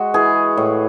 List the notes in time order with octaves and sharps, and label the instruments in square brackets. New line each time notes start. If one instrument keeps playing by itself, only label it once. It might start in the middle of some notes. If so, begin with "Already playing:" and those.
Already playing: [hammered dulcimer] G#3 F#4
E3 G#4
A2